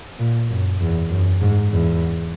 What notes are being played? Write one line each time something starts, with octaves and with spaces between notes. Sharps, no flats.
A#2
F#2
E2
F#2
G#2
E2